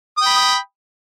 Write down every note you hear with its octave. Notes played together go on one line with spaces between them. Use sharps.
G5 B5 D#6